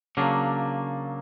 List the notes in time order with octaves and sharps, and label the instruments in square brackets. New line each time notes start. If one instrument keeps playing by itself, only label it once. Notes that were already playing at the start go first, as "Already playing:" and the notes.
[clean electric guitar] C#3 F#3 A#3 D4